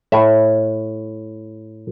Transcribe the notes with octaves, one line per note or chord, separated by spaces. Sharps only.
A2 E5